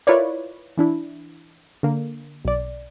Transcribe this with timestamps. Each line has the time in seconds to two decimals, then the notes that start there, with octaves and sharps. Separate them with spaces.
0.07 E4 F4 A#4 B4 C#5 D5
0.77 E3 D4 E4
1.83 D3 A#3
2.45 B1 D5